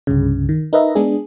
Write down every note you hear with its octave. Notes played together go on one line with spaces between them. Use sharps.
C2 G2 C#3
D#3
D#4 A#4 B4 D#5 E5 A#5
G#3 B3 D4 G#4